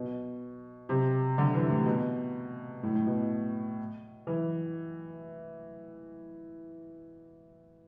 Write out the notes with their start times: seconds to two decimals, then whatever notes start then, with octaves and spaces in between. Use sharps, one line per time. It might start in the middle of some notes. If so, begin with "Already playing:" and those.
Already playing: B2
0.89 C3
1.38 D3
1.55 E3
1.70 A2
1.86 B2
2.83 A2
2.95 A2
3.07 B2
4.27 E3